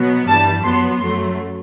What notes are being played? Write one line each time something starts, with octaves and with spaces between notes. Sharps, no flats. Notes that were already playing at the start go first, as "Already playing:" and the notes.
Already playing: B2 F#3 B3
G2 E3 G3 A5
F#2 F#3 B3 C6
F#2 F#3 A3 C6